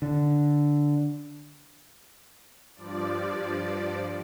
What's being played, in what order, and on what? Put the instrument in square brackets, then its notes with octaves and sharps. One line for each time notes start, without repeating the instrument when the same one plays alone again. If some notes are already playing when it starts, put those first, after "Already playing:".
[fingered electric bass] D3
[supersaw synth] G2 F3 D5